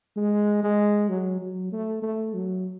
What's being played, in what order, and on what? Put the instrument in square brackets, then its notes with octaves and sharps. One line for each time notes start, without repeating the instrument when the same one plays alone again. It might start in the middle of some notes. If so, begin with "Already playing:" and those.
[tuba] G#3
G#3
F#3
F#3
A3
A3
F#3